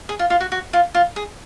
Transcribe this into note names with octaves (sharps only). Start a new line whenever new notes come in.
G#4
F4
F4
F#4
F#4
F4
F4
G#4